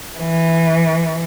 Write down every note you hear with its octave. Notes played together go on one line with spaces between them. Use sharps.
E3